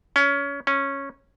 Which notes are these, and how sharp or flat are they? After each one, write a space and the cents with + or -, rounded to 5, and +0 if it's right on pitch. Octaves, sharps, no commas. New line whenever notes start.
C#4 +20
C#4 -10